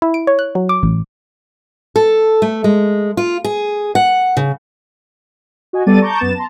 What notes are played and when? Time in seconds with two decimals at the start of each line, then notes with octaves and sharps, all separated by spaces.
0.02 E4
0.14 D7
0.27 C#5
0.39 F#6
0.55 F#3
0.69 D6
0.83 A1
1.96 A4
2.42 A3
2.64 G#3
3.17 F4
3.44 G#4
3.95 F#5
4.37 C#3
5.73 F#4 D#5 G#5
5.86 G3 B3 A4 D5 A6 D#7
6.00 A5 A#5 C#6 D6 G6
6.19 F#2 B3 A6 E7
6.35 A5 A#5 C6